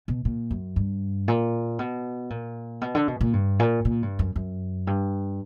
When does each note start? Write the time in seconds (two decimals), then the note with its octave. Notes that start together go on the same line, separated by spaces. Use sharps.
0.08 B2
0.25 A#2
0.51 F#2
0.76 G2
1.28 A#2
1.79 B2
2.30 A#2
2.81 B2
2.95 D3
3.08 B2
3.21 A#2
3.33 G2
3.60 A#2
3.85 A#2
4.03 G2
4.19 F#2
4.36 F#2
4.87 G2